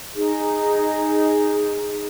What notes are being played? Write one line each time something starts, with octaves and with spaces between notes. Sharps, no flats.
D#4 G#4